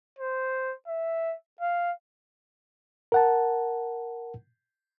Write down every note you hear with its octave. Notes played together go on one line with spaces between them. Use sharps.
C5
E5
F5
A#4 F#5 A5